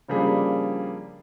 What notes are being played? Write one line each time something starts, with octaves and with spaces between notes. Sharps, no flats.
C#3 F3 G3 A#3 D4 G#4